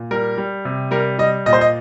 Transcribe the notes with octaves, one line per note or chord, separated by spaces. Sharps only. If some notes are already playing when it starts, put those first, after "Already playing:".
Already playing: A#2
G3 A#4
G3
C3
G3 A#4
G3 D#5
A#2 D#5
C5
D#5